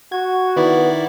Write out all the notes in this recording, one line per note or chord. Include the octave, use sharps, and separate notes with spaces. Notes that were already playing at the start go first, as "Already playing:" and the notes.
F#4 G#6
D#3 B3 E4 D5